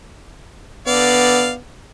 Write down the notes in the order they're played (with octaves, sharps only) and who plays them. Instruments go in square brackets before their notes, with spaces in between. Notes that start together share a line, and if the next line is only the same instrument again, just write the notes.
[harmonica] D3 D5 F5 [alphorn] B3